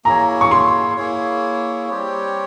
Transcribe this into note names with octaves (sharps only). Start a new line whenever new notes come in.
A#3 E4 G#4 C#5 A#5
C#6
C6
A#3 E4 G#4 C#5
G3 C4 G4 C#5